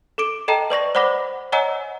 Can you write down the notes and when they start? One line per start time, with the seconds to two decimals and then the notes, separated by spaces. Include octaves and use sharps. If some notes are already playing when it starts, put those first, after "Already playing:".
0.18 A4 D6 D7
0.48 A4 D#5 G5 A5 A#5
0.70 B4 D5 C#6 A#6
0.95 C5 D5 F#5 B5 D6 A#6
1.52 C#5 D#5 F#5 G#5 A#5 E6